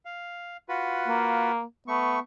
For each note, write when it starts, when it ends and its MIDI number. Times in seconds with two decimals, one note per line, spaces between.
0.05 0.57 77
0.69 1.52 65
0.69 1.52 66
0.69 1.52 71
1.08 1.63 58
1.88 2.20 57
1.88 2.18 59
1.88 2.20 85